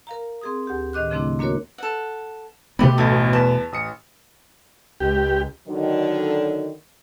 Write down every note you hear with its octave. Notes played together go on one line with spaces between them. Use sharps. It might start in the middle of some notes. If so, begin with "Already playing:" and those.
A#4 F5 A#5
C4 G#4 D#6
D2 G4
A2 D#3 D#5 D6 F#6
C#3 F3 A3 C4 D4 E4
A#3 D4 F#4 A#4 C#5
A4 F#5
B2 A3 B3 G4 B5
A1 D2 A4 D#6
E2 B4 A5
A1 D#6 C#7
C#2 G4
D3 D#3 F#3